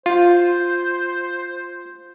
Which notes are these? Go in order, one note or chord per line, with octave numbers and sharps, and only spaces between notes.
F4 C5